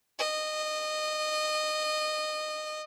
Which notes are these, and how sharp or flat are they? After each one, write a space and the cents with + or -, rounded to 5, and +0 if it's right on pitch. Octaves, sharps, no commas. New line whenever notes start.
D#5 -20